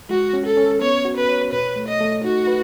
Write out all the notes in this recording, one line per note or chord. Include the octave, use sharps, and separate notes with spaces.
G#3 F#4
C#4
A4
C#4
B3 C#5
F#4
B4
C#5
B2 B4
A3
D#5
A3
D#4 F#4
B4